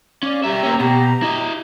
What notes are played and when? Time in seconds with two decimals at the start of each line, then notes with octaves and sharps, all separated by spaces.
0.23 C#4 D5 F5 D6
0.44 G3 G4 E5 A#5 E6
0.63 A#3 C#4
0.80 B2 G4 A#5
1.22 E4 D#5